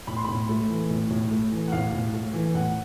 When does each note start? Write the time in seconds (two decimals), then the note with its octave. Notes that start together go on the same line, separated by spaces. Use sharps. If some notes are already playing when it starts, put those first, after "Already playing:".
0.07 A2 B5
0.17 C6
0.24 A2 B5
0.49 A3
0.69 E3
0.90 A2
1.10 A2
1.31 A3
1.52 E3
1.68 F#5
1.72 A2 F5
1.92 A2
2.13 A3
2.33 E3
2.54 A2 F#5